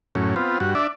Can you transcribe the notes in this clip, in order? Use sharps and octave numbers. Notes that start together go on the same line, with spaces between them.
F#2 A2 C#4
B3 C4 F4
G2 F#4
D4 D5 E5